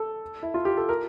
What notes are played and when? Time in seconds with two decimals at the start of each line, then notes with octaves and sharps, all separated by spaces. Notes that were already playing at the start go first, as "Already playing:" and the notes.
Already playing: A4
0.43 E4
0.54 F4
0.65 G4
0.77 A4
0.89 A#4